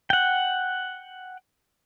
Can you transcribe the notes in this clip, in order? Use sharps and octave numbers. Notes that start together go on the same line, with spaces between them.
F#5 G5